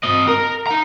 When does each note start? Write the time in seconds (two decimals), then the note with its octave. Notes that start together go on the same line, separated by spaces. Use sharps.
0.04 C4 D#5
0.28 A#4
0.67 D#4 A#5